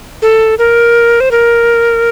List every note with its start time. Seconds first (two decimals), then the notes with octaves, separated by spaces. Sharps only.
0.22 A4
0.58 A#4
1.20 C5
1.31 A#4